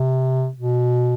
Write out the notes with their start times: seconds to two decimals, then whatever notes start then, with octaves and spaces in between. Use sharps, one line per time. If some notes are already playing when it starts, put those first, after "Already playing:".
Already playing: C3
0.57 B2